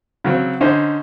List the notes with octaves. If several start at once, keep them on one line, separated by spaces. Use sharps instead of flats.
C#3 F#3 C4
D3 C#4 D#4 C5